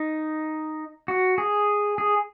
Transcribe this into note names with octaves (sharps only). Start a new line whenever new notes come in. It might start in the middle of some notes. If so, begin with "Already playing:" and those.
Already playing: D#4
F#4
G#4
G#4